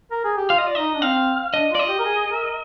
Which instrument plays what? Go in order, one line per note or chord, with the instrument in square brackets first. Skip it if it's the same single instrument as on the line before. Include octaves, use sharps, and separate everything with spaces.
[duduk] A#4
G#4
G4
[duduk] F4 [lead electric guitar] F5
[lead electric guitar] D#5
D5
[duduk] D#4 [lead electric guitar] D#5
[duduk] D4
[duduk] C4 [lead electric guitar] F5
[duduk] D4 [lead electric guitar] D#5
[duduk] F4 [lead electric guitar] D5
[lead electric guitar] D#5
[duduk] G4
A#4
G#4
G#4
A#4